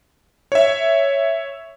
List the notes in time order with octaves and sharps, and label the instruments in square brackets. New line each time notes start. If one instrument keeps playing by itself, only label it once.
[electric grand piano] C#5 E5